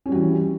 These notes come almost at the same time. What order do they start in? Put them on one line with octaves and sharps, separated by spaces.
C#4 G3 F#4 E3